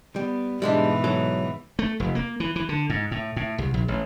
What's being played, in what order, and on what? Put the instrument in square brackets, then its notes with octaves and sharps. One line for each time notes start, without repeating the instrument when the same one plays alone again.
[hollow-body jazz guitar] G3 [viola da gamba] B3
[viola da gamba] G#2 B2 E3 [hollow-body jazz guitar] G3 G#3 D4
[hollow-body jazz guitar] F#3 F#4 A4
[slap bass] A3
F1
A#3
E3
E3
D3
G#2
A2
A2
C2
A#1
A1